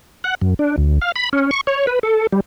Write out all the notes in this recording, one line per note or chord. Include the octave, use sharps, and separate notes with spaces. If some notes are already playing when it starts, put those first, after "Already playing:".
F#5
F#2
D4
D2
F5
B5
C#4
C#6
C#5
B4
A4
G3